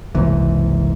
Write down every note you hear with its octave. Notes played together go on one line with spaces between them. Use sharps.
F#1 C2 G#2 E3